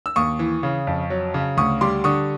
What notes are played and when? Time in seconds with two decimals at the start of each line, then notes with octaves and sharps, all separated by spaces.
0.06 E6
0.16 D#2 C#6 D#6
0.39 E3
0.63 C#3
0.87 F2
1.10 F#3
1.34 C#3
1.57 D2 C#6 D#6
1.81 G3 C6 D6
2.04 D3 C#6 D#6